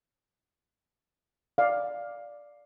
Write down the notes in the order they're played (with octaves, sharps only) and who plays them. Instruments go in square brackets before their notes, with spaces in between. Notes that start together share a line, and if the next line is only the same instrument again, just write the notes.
[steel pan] D5 F5